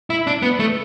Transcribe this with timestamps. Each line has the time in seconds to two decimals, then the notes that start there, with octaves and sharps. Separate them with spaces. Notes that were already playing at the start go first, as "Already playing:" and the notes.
0.10 E4
0.27 D4
0.42 B3
0.60 A3